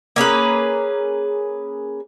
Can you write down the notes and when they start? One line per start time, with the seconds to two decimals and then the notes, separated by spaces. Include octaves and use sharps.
0.16 A#3 C#4 G#4 B4